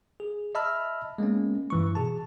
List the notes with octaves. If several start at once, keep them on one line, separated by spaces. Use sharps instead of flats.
G#4
D#5 E5 A5 B5 E6 F6
G#3 A#3 B3 C#4
G2 E3 C#6
B2 G#4 A5